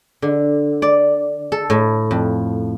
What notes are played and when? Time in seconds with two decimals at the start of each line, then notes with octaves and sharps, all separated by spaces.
0.22 D3
0.82 D5
1.52 A4
1.70 A2
2.11 F2